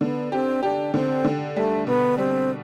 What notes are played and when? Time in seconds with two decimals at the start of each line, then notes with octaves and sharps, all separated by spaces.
0.01 D3 B3
0.32 C4 G4
0.63 D4 G4
0.94 D3 C4
1.24 D3
1.56 G3 A3
1.87 B2 B3
2.18 G3 C4